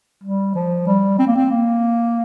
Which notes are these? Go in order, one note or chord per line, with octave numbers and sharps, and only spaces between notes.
G3
F3
G3
C4
A#3
C4
A#3